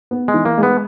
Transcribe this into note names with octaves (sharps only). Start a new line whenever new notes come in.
B3
G#3
E3
A#3
G#3
B3